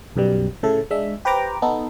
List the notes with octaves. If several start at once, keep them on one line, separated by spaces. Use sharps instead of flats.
B1 F#2 B2 G3
A2 C#3 A3 A4
G#3 D4 E5
G4 B4 C5 G5 A#5 D6
B3 D#4 A4